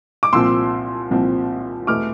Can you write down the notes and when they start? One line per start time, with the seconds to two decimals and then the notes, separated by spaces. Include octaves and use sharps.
0.23 D6
0.33 C2 A#2 F3 C4 C6 E6
1.11 C2 A#2 F3 C4
1.87 E1 E3 A3 E4 D6 F6